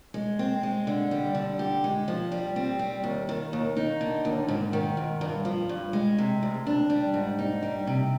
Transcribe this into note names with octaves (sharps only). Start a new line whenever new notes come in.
G#3
C4
G#3
D3
G3
D3
G4
G#3
F3
G3
C4
G3
D#2
D#3
D#2
D#4
D3
D#2
G#2
D#3
G#2
G2
F3
G2
G#3
C3
D2
D4
G3
G#2
D#4
G3
C3